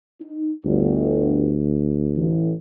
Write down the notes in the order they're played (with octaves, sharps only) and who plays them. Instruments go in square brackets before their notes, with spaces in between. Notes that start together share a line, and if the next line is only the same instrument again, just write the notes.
[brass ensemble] D#4
[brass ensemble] G1 [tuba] D2
[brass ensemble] A1 E3